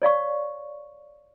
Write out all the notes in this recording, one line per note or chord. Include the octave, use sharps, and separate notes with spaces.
C#5 D5 F5 C#6